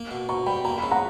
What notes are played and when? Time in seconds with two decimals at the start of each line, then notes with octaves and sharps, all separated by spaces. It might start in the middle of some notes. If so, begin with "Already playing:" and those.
Already playing: A#3
0.11 B2
0.29 B2 A#5 C#6
0.46 G3 G5 B5
0.65 A#3 A#5
0.78 C#3 B5
0.91 F#5 A#5